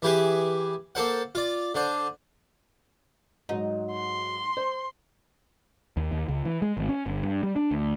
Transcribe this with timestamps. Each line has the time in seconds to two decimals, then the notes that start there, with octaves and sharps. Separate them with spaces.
0.02 E3 E4 G4 G#4 B4
0.95 A#3 A4 C5 F#5
1.35 F4 D5
1.75 D3 D4 C5
3.49 G#2 F#3 D#4
3.92 C6
4.57 C5
5.97 D#2
6.12 D#2
6.29 C#2
6.45 E3
6.62 G#3
6.77 G#1
6.89 C#4
7.06 G1
7.23 G2
7.43 G3
7.56 D4
7.71 D2